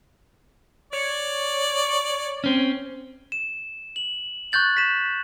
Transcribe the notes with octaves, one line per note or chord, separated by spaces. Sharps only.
C#5 D5
C4 C#4
E7
F#7
C#6 F#6 G6 A6 F#7
B6 E7